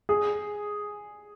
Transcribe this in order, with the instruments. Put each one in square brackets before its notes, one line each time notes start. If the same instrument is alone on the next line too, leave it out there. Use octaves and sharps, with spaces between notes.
[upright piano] G#4